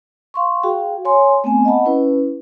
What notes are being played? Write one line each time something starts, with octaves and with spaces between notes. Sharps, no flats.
F5 C6 C#6
F#4 G#4 F5 G5
C#5 G#5 C6
A3 B3 C4 G#5
D#5 F#5 A5 B5
C#4 E4 B4